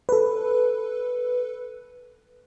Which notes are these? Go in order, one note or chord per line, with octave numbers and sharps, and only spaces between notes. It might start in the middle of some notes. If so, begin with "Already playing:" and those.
A4 B4